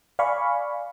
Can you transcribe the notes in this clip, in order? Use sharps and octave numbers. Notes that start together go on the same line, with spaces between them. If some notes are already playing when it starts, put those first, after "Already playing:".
D5 F5 G#5 B5 C#6